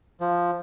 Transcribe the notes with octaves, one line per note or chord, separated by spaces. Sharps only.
F3